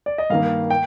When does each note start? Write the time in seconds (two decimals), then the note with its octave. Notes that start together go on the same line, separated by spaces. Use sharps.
0.06 D5
0.18 D#5
0.30 G2 D#3 A#3 F5
0.70 G5